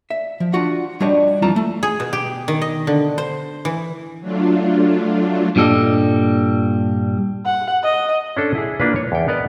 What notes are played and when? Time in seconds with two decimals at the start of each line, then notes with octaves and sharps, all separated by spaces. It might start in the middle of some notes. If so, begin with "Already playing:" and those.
0.10 E5
0.40 F3
0.53 D4 F4 F#4 F#5
1.00 G3 D4 F#4 G4 C#5 D#5
1.42 F2 E3 F4 A5 A#5
1.56 A3
1.83 G#4
2.00 B2
2.13 G4
2.48 D#3
2.62 D#5
2.87 D3
3.18 C5
3.65 E3
4.21 F#3 A3 D4 F4
5.56 G2 A#2 G3 A4 D#5
7.46 F#5
7.84 D#5
8.37 C#4 D4 A4
8.55 E4 G#4
8.80 A#3 D4 F4 B4
8.96 C#5
9.12 E2 G5
9.28 B3 A#4 D5 D#5